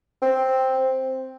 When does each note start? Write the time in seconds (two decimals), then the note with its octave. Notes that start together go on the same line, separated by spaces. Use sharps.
0.22 C4